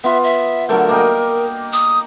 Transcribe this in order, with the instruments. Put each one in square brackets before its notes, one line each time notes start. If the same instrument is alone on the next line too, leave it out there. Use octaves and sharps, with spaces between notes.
[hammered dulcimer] B3 F4 [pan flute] E5
[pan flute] E5
[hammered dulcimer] D3 F#3 A3 [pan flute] A#4
[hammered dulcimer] A#3 D#5 G5
[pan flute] D#6